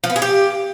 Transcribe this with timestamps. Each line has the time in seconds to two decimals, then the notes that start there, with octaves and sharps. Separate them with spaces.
0.04 F3
0.10 B3
0.16 G#4
0.22 G4